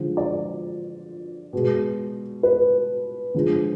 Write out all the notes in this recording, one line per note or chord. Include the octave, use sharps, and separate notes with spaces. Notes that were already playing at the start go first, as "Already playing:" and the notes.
Already playing: D3 F3 G#3
D5
B2 G#3
B4
D3 F3 G#3